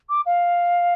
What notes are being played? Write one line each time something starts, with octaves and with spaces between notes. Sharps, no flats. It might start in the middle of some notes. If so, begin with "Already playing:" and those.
D6
F5